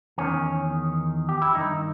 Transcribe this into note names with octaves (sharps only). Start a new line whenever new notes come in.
E2 D#3 C#4
G4
E4
G2 D#3 D#4